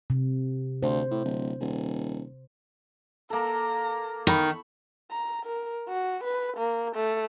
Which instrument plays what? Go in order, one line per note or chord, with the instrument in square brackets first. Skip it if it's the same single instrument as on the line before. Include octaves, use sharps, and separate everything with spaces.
[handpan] C3
[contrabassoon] D2 [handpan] C5
[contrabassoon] A2
D1
D#1
[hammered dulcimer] A#3 A4 [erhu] A#5
[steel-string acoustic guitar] D#3 [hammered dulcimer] B5 C#6
[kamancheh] A#5
A#4
F#4
B4
A#3
A3